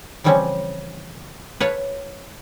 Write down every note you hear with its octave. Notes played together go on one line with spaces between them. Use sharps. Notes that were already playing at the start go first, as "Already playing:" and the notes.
C#3 E3 F3 G3 C4 C#4
B4 C#5 F5 A5